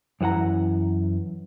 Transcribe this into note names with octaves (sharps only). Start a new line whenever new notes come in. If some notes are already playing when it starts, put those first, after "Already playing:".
F#2 E3 F4 F#5 A#5